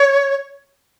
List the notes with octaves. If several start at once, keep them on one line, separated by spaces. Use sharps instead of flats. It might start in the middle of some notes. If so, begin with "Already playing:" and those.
Already playing: C#5